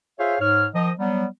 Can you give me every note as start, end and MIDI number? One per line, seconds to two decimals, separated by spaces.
0.19 0.36 65
0.19 0.36 68
0.19 0.36 72
0.19 0.36 73
0.19 0.36 76
0.19 0.36 77
0.40 0.66 44
0.40 0.66 73
0.40 0.66 89
0.75 0.91 51
0.75 0.91 53
0.75 0.91 75
0.98 1.26 54
0.98 1.26 55
0.98 1.26 59